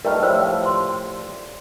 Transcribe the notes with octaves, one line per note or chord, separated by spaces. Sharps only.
G3 A3 D#4 A#4 B4
A2 F3 G3 C5 E6
C6